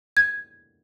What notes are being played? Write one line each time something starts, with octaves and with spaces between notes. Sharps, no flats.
G#6